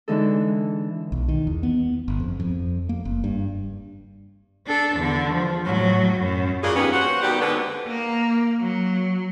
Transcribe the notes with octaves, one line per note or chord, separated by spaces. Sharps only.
D3 E3 G#3 D#4 A4
B1
D#3
E2
B3
G1
F2
F2
A#3
F#1
G2
D4 A4
E2 D3
F3
A2 F#3
F#2
C#3 F#3 A#3 D4 F4 G#4
D#2 B3 C#4
F#4 C5 C#5 F#5
D#2 B2 G3 G4 F#5
G#2 D3 B3
A#3
F#3